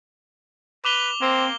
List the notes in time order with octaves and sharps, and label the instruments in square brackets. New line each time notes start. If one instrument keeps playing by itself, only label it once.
[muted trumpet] B4 [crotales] D6 F7 G7
[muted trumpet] A#3 [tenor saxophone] C4